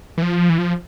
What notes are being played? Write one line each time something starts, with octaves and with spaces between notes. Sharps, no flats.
E3
F3
E3
F3